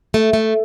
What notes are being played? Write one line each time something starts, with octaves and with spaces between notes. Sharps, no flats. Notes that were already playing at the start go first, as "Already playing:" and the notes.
A3
A3